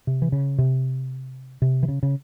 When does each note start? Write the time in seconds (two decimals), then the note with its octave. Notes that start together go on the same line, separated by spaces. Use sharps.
0.07 C3
0.22 E3
0.32 C#3
0.58 C3
1.62 C3
1.83 E3
1.88 C#3
2.03 C#3